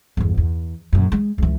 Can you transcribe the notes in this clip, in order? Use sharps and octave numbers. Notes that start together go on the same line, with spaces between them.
G1 E2
E2
A#1 F#2
G#3
C#2 E3